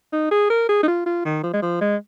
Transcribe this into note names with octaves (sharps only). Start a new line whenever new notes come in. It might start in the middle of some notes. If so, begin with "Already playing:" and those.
D#4
G#4
A#4
G#4
D#4
F4
F4
D#3
F3
G#3
F3
G#3